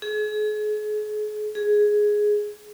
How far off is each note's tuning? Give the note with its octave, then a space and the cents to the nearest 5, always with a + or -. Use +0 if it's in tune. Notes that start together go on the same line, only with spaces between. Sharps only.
G#4 +35
G#4 +5